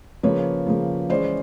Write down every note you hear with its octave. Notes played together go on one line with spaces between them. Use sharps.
C#3 F3 A#3 B4 C#5
C#3 F3 A#3
E3 G#3 C#4 C5 D5